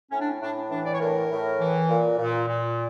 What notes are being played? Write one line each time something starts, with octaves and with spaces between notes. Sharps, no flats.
A2 C#4
D4
C#4
A2 D4
E3 D4
D5
C#5
A2 A#4
A2
E3
A#2
A#2
A#2